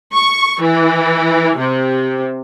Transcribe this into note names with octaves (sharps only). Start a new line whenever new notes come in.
C#6
E3
C3